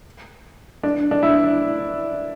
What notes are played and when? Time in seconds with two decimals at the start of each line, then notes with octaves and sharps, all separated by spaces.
0.83 D4
1.11 D4
1.23 E4